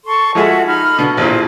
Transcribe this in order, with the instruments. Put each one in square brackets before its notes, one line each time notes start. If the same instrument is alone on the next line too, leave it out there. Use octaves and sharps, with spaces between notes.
[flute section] A4 C6 C#6
[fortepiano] F3 G#3 G#4 [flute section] F#4 A4 E5
[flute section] D#4 B5 F6
[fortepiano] B2 D3
[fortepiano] A1 E2 A#2 [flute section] C5